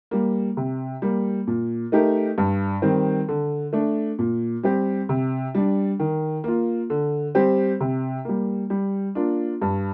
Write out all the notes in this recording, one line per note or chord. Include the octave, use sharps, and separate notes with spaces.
G3 A#3
C3
G3 A#3
A#2
A3 D#4 G4 A#4
G2
D#3 G3 C4
D3
A3 D4
A#2
G3 C4 G4
C3
G3 D4
D#3
A#3 F4
D3
G3 C4 G4 C5
C3
G3 A#3
G3
A#3 D4 F4
G2